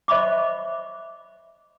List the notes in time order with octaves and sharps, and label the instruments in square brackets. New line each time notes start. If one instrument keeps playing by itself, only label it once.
[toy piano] C5 D#5 E5 B5 C#6 D6